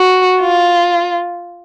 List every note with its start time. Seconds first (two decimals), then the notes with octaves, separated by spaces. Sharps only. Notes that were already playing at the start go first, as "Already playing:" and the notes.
Already playing: F#4
0.41 F4